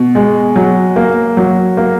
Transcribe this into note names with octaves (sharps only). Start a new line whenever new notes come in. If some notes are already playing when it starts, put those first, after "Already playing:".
Already playing: B2
G#3
F#3
A#3
F#3
A#3